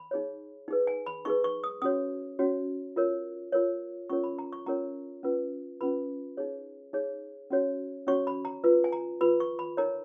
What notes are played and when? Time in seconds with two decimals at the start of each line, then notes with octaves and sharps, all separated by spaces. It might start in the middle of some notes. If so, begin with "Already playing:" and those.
Already playing: B5
0.11 D#4 G#4 C#5
0.68 D#4 G#4 B4
0.87 G#5
1.06 B5
1.25 D#4 G#4 B4 C#6
1.44 C#6
1.64 D#6
1.82 C#4 F#4 C#5 D#6
2.39 C#4 F#4 C#5
2.96 F4 A#4 C#5
3.52 F4 A#4 C#5
4.09 C#4 F4 A#4 C#5 C#6
4.24 B5
4.39 A#5
4.52 C#6
4.66 C#4 F4 A#4 C#5 A#5
5.23 C#4 F4 B4
5.81 C#4 F4 B4 B5
6.37 D#4 G#4 C#5
6.93 D#4 G#4 C#5
7.50 C#4 F#4 C#5
8.07 C#4 F#4 C#5 C#6
8.27 B5
8.45 A#5
8.64 F4 B4
8.84 G#5
8.92 A#5
9.21 F4 B4 B5
9.40 C#6
9.59 B5
9.77 D#4 A#4 C#5 A#5